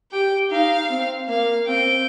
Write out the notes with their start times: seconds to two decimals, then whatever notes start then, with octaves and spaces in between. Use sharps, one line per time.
0.12 G4 G5
0.51 D#4 F5
0.90 C4
1.28 A#3 F5
1.67 C4 G5